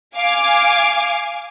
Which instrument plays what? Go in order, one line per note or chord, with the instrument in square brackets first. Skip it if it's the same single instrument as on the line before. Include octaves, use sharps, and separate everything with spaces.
[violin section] F5 G#5 D6